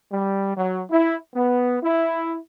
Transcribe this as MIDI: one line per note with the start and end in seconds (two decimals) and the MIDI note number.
0.12 0.56 55
0.57 0.82 54
0.90 1.17 64
1.35 1.78 59
1.83 2.37 64